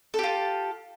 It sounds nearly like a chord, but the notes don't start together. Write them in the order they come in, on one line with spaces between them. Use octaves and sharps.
A4 G4 F4